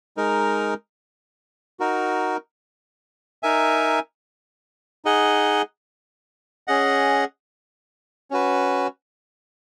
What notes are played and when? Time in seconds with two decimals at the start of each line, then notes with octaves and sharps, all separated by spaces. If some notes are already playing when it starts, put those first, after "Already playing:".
0.17 G#3 D#4 A#4
1.80 D#4 F#4 A#4
3.43 D#4 A#4 E5 G#5
5.05 D#4 G#4 D#5 F#5
6.68 C#4 G#4 D#5 F#5
8.31 C#4 F#4 B4